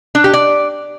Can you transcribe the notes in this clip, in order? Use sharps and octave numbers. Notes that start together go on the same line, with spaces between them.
D4
G4
D5